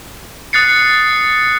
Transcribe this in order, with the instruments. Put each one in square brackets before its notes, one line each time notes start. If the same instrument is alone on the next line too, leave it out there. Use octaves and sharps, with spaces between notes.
[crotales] D#6 F#6 A6 C7 C#7